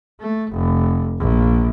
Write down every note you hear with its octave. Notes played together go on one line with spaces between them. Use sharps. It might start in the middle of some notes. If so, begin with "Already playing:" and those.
A3
F1
A#1